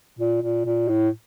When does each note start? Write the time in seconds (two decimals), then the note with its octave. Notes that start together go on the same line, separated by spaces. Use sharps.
0.19 A#2
0.42 A#2
0.66 A#2
0.88 A2